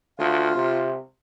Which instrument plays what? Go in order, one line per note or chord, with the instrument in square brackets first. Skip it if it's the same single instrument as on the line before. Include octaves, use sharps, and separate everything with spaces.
[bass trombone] D2 [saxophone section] F4 F5
[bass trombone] C3